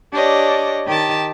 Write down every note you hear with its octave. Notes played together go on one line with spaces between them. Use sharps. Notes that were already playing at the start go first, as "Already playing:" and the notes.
D4 G4 C#5 D#5
D#3 G4 A5